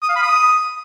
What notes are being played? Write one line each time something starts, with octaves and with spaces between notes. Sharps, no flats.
D#6
F5
B5
D#6